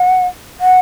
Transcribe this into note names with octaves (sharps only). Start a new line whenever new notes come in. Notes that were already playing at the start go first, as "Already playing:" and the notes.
Already playing: F#5
F#5